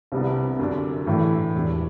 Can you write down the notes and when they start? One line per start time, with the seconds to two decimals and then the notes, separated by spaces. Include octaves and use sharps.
0.12 C2 C3 G3 B3 D4
0.59 F#2 D3 G3 D4
1.06 A2 E3 A3 E4
1.54 E1 E2 B2 G3 D4